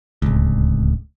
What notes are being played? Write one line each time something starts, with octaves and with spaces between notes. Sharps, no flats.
D1 G1 C#2